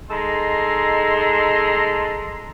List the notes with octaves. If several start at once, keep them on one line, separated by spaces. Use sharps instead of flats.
G#3 D#4 A4 D#5 A#5 C6